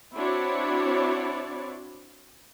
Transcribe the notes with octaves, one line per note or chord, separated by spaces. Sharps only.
C4 D4 E4 F#4 C#5 D5